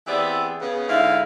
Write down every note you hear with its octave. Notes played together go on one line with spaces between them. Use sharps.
E3 B3 C4 G4 G#4 D5
C#3 B3
G#2 D3 E4 F5